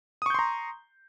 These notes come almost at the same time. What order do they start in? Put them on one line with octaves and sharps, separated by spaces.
D#6 C#6 G6 C6 A#5